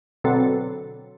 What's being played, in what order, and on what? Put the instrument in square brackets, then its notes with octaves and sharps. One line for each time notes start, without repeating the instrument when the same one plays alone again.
[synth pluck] B2 D3 F#3 C4 A4